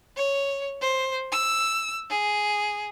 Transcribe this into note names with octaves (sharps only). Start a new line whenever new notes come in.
C#5
C5
E6
G#4